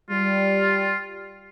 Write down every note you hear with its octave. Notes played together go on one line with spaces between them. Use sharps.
G3 F4